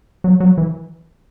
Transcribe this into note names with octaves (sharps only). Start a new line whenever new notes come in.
F#3
F#3
E3